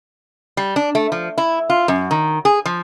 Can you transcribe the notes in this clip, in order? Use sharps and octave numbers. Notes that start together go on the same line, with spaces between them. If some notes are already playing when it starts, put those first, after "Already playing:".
G3
D4
A3
F3
E4
F4
F#2
D#3
G#4
F3